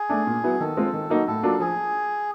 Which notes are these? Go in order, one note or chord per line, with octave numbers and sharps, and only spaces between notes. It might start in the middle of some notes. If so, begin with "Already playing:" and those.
Already playing: G#4
A3 D4
A#2
F#3 B3 E4
D#3 A4
G#3 C4 F4
D#3
F#3 A#3 D#4 F#4
A2 A4
F#3 A#3 D4 F4
F3 G#4